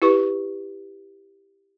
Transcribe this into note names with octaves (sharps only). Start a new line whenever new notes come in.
E4 G4 B4 C#6